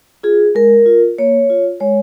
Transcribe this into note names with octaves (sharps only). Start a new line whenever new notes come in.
F4 G#4
G#3 A#4
F4
A#3 C#5
F4
G#3 C#5